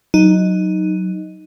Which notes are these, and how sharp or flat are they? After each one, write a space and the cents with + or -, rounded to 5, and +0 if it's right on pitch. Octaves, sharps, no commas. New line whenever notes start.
F#3 +0 D#4 +0